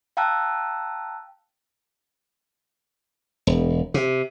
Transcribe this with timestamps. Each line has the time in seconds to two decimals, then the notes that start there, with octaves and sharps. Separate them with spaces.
0.17 F5 G5 A5 A#5 E6 F#6
3.47 E1
3.94 C3